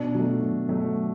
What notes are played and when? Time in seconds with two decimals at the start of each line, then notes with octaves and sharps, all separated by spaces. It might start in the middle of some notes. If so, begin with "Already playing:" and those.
Already playing: B2 D4
0.15 F#3 A3
0.42 B2
0.69 F#3 A3